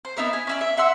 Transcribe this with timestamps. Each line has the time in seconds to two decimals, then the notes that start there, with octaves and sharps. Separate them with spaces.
0.05 C5
0.17 B3 D#4 E4 A#4
0.33 G#5
0.47 C#4 E4 D5
0.61 E5
0.77 E5 F#5 C6 E6